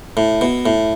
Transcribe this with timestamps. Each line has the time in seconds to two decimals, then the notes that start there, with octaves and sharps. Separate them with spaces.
0.17 A2
0.41 B2
0.66 A2